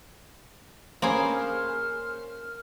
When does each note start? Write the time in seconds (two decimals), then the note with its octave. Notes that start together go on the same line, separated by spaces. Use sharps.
1.02 A#3 C#4 G#4 C5 B5
1.35 F6